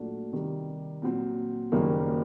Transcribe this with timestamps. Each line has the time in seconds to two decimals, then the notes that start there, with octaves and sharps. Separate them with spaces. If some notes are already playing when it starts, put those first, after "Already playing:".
Already playing: A#2 F#3 A3 D4
0.32 C3 D#3 G3
1.02 A#2 F#3 C4
1.72 F#1 F#2 D#3 G3 A#3